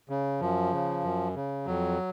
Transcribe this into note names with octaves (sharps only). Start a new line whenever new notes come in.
C#3
F#2 F3
C#3
F#2
C#3
F2 F#3